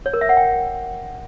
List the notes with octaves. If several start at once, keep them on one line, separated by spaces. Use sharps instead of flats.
C#5
A#4
E5
F#5
G5